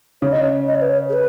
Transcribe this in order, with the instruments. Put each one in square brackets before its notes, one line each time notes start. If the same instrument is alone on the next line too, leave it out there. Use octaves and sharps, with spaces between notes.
[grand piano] C#3 [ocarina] C#5
[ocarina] D#5
C#5
D#5
C#5
B4
C#5
G#4
B4